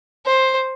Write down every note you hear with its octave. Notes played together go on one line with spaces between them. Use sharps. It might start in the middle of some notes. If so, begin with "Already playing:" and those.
C5